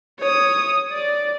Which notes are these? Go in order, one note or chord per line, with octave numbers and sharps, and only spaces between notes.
C#5 D#6
D5